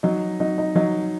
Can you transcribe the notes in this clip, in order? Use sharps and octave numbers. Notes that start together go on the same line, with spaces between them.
F#3 D#4
F#3 D#4
D#4
F#3 D#4